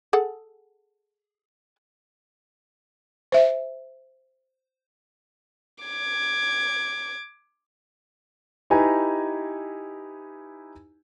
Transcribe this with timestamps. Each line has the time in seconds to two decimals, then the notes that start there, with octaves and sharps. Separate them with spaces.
0.13 G#4 A4 F#5
3.32 C5 E5
5.84 D6 G#6
8.70 D#4 E4 G4 B4 G#5 A#5